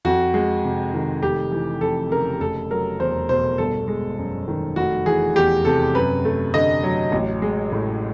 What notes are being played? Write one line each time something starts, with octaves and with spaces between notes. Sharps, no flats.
F2 F#4
G#3
C3
D#3
F1 G4
E3
F2 A4
C#3 A#4
F1 A4
F#3 A#4
E2 C5
B2 C5
G1 A4
G#3
F#2
D#3
F1 F#4
E3 G#4
E2 G4
C3 A4
F#2 B4
A3
D3 D#5
F#3
A1
G#3
A2